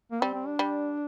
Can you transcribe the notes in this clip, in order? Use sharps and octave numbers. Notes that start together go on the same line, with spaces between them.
A#3
G3 C4
C4
D4
G3